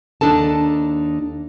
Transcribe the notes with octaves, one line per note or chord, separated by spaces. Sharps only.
D#2 D4 D#4 A4 A5